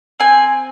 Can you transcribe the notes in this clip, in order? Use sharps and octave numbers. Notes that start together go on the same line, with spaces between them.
C4 G#5